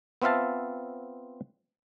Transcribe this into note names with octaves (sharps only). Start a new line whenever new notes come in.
B3 C4 F4 E5 F5 A5